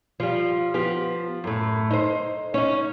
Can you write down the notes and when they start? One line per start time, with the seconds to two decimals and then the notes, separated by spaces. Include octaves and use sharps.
0.20 F3 G3
0.74 F3 B3 G4
1.44 F#2 A2
1.91 D#4 C5
2.54 C#4 D#4